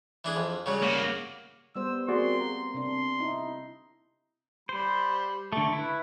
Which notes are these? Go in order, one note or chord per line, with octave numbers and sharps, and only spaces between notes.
E3 D4 G#4
F2
C#3 F#3 G3
A#3 F#4
G3 B3 C5 E6
A#3 C4 F#4 G#4 D5 C6
A#5
C3 D4 C6
D#4 E4
G3 C5 B5
D3 A3 A5 C#6
E4 B4